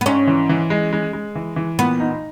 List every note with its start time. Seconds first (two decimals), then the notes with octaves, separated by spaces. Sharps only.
0.01 B3
0.06 G#2 C#4
0.27 E3
0.49 E3
0.70 G#3
0.93 G#3
1.13 G#3
1.35 E3
1.56 E3
1.79 A#2 B3
2.00 D#4